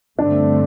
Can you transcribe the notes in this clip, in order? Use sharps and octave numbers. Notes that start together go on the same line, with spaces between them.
G2 D3 A3 C4 D4